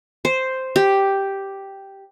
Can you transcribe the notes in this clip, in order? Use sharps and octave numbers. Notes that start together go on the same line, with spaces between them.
C5
G4